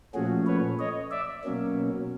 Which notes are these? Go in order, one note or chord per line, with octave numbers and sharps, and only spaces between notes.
A#2 F3 A3 C#4 F#4 G#4
B4 C#5
C#5 D#5
D5 E5
B2 F#3 A#3 C#4